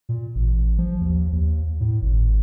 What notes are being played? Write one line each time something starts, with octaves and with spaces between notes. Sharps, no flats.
A#2
A1
F3
D#2
D#2
A2
G#1